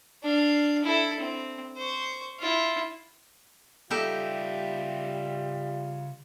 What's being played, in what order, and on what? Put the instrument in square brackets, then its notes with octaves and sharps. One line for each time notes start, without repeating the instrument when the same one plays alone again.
[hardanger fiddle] D4 F5
E4 A4
C4
C5 C#6
E4 F4
[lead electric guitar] C#3 E5 [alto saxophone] G3 [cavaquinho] D#4 G4 A4 [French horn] F4